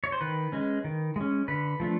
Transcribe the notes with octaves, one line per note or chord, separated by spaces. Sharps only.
C#5
C5
D#3 B4
G#3 C#4
D#3
G#3 C#4
D3 B4
F3 A3 D4